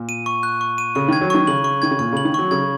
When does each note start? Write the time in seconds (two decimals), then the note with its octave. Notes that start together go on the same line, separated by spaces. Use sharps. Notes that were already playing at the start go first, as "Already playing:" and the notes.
Already playing: A#2
0.09 D#7
0.26 C#6
0.43 F#6
0.61 C#6
0.78 D#7
0.95 C#3 C#6
1.08 D#3 G#6
1.21 F#3
1.30 D#3 C#6
1.47 C#3 F#7
1.64 C#6
1.82 D#3 G#6
1.91 C#3
1.99 A#2 C#6
2.13 C#3 F#7
2.25 D#3
2.34 F#3 C#6
2.51 C#3 G#6